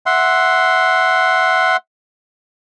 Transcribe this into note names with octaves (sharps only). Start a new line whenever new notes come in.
E5 F#5 C6